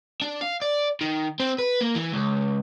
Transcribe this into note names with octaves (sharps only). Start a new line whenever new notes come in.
D4
F5
D5
D#3
C4
B4
A#3
E3
C#2